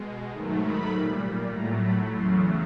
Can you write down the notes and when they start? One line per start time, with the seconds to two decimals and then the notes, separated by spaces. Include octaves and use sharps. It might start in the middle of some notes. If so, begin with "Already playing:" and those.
Already playing: B2 G#3
0.32 G#2 D#3 F#3 A3
0.62 B5
0.92 A#2 G3
1.53 A2 F#3 A3 A#5
1.83 B5
2.13 E2 C#3 F#3 A3 C6